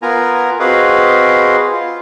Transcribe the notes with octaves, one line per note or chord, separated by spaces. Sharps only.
B3 F4 A#4 G#5 A#5
C4 F#4 G#4 B4 D#5 F5
F4